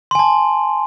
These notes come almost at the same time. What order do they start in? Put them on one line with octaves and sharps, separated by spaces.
C6 G#5 A5